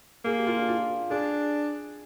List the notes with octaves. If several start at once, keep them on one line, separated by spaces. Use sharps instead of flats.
A#3 G#4
G4
F4
D4
F4
D4 G#4